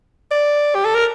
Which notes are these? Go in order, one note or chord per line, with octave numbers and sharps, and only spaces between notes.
D5
G4
A4
A#4